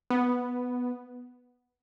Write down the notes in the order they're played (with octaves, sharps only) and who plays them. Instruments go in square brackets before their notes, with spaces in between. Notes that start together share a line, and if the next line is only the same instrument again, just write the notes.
[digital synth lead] B3